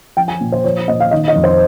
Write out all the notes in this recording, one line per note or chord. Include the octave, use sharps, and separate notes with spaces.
F3 G5
G#5
A#2
C5
F3 C#5
A#2 D#5
F5
D#3 D#5
D#5
F2
C5